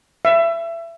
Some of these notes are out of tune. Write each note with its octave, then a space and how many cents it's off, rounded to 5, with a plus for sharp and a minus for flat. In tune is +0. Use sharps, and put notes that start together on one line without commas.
E5 +25